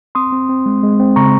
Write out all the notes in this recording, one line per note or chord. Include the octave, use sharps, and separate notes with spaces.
C4 C6 D#6
C4
C4
G#3
G#3
C4
C#3 A#5 C#6